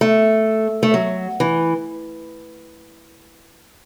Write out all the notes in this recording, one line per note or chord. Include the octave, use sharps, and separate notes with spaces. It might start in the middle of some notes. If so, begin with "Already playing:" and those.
A3
A3
F#3
E3